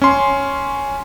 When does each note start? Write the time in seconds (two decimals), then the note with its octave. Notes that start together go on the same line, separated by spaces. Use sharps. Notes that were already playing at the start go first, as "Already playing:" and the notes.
0.02 C#4 C6